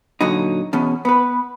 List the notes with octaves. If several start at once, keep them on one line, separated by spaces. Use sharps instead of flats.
A#2 D3 F#3 D#4
E2 B2 C#4
B3 B4